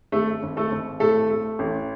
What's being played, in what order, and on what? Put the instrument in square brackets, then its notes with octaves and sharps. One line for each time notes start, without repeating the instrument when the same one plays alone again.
[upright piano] G#1 A3 A4
G#1
A3 A4
G#1
A2 A3 A4
A3
A1